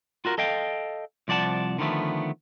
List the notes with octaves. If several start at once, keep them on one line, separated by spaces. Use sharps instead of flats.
F4 F#4 A#4
A4 D#5 F5 G5
C2 F3 D5 F#5 A5
D3 D#3 F3 A3 B3